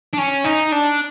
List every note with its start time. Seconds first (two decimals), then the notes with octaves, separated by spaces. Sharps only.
0.13 D4
0.18 C#4
0.44 D#4
0.72 D4